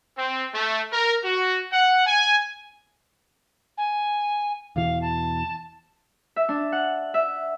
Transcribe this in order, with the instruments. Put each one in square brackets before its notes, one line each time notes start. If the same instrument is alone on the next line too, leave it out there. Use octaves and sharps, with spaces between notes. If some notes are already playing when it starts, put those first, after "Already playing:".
[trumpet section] C4
A3
A#4
F#4
F#5
G#5
[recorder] G#5
[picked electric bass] E2 B2 E3 [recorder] F5
[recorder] A5
[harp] E5
D4
F#5
E5